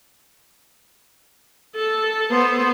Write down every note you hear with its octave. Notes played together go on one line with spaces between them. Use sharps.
A4
B3 C5